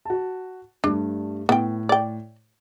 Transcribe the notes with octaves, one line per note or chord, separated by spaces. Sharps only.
F#4 A5
G2 G3 A3 D4
A2 B3 G5
D5 G5